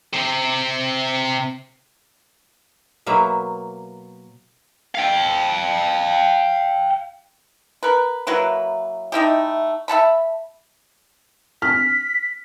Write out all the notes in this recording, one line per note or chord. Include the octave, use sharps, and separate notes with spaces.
C3 C4
B2 F#3 A#3 E5
F5 G5
A#4 B4
F#3 A#3 E4 B4
A3 D#4 E4 G4
E5 F#5 A5 B5
F6 B6